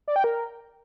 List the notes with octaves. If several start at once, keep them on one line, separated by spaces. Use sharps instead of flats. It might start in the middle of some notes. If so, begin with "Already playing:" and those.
D5
G5
A#4